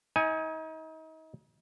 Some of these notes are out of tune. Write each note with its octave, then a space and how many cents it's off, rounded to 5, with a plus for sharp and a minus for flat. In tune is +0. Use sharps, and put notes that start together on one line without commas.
D#4 +35 G#5 +0